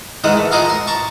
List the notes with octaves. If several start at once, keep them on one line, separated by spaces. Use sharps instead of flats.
G#2 D#3 E3 G#3 F#5 D#6
A3
F4 G#4 A#4 C5 D#5 F#5
A#5 C6
A5 A#5 C#6